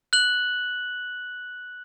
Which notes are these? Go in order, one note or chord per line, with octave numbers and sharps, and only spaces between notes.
F#6 F#7